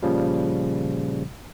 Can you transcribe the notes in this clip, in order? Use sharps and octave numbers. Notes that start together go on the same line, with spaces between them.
A#2 C#3 F3 G3